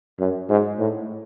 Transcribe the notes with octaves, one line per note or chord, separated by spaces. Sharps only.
F#2
G#2
A2